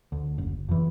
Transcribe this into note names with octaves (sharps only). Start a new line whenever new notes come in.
D2
F#1
F2 E3